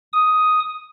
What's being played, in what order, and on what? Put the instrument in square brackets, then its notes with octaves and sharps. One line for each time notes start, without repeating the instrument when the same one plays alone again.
[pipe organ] D#6